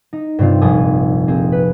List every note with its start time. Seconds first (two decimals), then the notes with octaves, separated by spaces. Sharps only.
0.13 D#4
0.39 G2 C3 C4 F4
0.62 F1 A#1 G#5 D#6
1.28 A#3 C4 G#4
1.52 B4